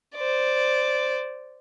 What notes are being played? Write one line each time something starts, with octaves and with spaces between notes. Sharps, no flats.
C5 D5